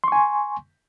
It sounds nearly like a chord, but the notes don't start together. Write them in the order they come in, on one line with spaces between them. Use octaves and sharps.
C6 C#6 G#5